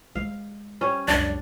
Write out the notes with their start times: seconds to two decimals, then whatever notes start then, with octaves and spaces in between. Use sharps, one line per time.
0.15 G#3 F5
0.81 G3 C#4
1.08 C#2 F#2 D4 D5